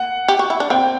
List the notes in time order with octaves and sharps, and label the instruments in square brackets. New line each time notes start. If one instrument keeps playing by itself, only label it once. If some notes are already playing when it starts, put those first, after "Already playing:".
Already playing: [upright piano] F#5
[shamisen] G4
F#4
E4
D4
[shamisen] C4 [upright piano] G5